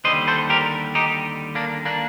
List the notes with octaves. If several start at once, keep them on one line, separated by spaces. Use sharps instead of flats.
D#2 D3 G3 C5 D#5
A4 C5
G4 A#4
D#4 G4
A#3 D4
A#3 D4